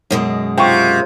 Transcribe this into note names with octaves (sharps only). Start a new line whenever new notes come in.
F#2 B2 G#3
C3 F4 G5 C#6